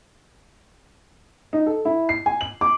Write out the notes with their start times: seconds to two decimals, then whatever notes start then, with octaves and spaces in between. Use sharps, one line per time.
1.53 D#4
1.66 A4
1.85 E4
2.09 C7
2.26 G#5
2.41 F#7
2.61 D6